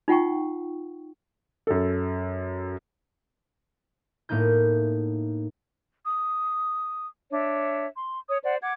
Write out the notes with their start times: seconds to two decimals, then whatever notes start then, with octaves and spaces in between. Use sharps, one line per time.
0.08 D#4 F4 F#5 G5 C#6
1.67 F#2 A4
4.29 A2 A#3 B3 D#4 G6
6.05 D#6
7.31 D4 C#5 E5
7.96 C6
8.29 C#5 D#6
8.44 C5 D5 F#5
8.62 F#5 D6 G#6